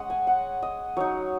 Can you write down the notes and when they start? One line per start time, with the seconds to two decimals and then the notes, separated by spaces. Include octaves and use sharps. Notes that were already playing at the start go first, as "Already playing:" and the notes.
Already playing: G#3 C#4 D#5 F#5
0.10 G#5
0.27 F#5
0.63 D#5
0.97 F#3 D#4 C#5